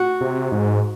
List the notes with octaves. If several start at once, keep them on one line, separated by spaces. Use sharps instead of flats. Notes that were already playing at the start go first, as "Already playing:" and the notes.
Already playing: F#4
C3
G#2